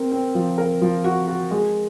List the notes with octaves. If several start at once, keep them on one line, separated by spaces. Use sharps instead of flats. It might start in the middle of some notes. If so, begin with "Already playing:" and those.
Already playing: C4 A#4
C4
F3
A#4
F3
F#4
F#4
G#3